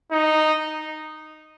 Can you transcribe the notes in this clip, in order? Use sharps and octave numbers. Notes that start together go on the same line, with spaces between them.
D#4